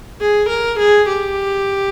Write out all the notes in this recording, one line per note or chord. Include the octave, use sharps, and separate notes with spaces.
G#4
A#4
G#4
G4